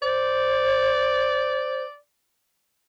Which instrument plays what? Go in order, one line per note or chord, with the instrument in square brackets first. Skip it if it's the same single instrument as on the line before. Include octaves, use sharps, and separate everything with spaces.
[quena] C5 [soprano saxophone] D5